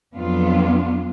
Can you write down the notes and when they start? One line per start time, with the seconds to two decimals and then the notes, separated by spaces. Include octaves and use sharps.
0.15 F2 F#3 B3 D4 F4